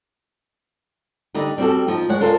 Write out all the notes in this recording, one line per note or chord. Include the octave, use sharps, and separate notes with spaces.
D3 G3 D#4
G3 C4 F#4 A4
F3 D#4
G#3 C#5 F#5
F4 A4 A#4 C5 D#5 F5